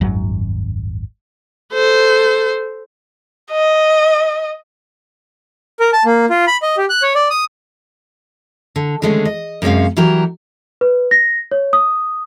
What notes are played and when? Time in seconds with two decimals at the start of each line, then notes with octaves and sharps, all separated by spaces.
0.01 D#1 G#1 F#2 F#3
1.73 A4 C5
3.51 D#5
5.80 A#4
5.93 A5
6.05 A#3
6.30 F4
6.48 B5
6.63 D#5
6.77 G4
6.90 F#6
7.02 C#5
7.15 D5
7.30 D#6
8.76 D3
9.02 D3 D#3 G#3 A3 C#4
9.25 D#5
9.62 F#2 C3 G#3 C#4 F5
9.97 E3 F#3 G3 G4 A#4
10.81 B4
11.11 A#6
11.51 C#5
11.73 D#6